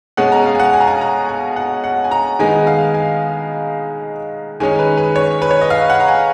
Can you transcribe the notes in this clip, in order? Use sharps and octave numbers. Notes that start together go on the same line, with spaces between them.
B2 G#3 C#4 F#5
A#5
F5
G#5
F#5
G#5
A#5
G#5
A#5
G#5
F#5
F#5
G#5
A#5
D#3 G#3 B3 D#4 G#5
F5
G#5
D#3 G#3 C#4 G#5
B4
B4
C#5
B4
C#5
D#5
F5
F#5
A#5
G#5